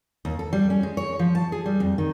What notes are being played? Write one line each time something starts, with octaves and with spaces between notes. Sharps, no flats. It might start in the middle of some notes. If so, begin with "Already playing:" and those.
D#2
A4
G3
C#4
G#3
C#5
F3
A5
G#4
G3
F2
D#3